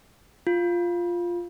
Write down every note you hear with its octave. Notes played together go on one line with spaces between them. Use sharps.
F4